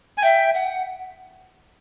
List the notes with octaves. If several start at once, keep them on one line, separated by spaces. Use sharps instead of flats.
G#5
E5 G5
F#5